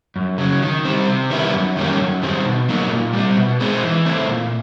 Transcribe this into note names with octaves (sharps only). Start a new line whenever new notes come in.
F#2
C#3 F#3
D#3
G3 C4
C3
D#3 G3 B3 E4
F#2
D#3 G3 A#3 C#4
F#2
D#3 G3 C4
B2
F#3 A#3 D#4
A#2
G3
C4
B2
G#3 C4 D#4
E3
A3 C4 E4
A#2